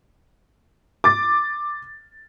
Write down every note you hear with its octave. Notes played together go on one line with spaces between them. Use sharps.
D6 A6